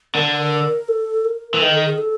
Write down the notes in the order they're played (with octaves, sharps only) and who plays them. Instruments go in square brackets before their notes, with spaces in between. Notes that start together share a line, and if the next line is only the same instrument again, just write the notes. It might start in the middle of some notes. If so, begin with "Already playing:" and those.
[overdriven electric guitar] D3 [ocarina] A#4
[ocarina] A4
A#4
[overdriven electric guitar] E3
[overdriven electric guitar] D#3 [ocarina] A4
[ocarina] G#4
A4